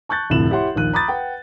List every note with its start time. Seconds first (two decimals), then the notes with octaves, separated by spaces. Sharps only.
0.09 A5 C#6 F#6 G6 A6
0.30 F1 D2 A2 C3 E7 F#7
0.50 E4 G4 C#5 F#5 C6
0.76 A#1 D#2 D#3 F#6 D#7
0.93 A#5 B5 D6 D#6 G6 A6
1.08 B4 F#5 G5